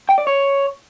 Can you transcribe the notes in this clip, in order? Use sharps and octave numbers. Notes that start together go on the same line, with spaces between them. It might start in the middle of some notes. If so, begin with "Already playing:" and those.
G5
D5
C#5